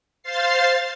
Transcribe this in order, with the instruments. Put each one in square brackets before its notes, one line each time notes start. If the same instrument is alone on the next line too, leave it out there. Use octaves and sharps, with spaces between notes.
[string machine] C5 F5 A6 C7